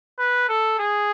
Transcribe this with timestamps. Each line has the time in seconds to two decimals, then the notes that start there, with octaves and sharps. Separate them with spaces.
0.19 B4
0.49 A4
0.79 G#4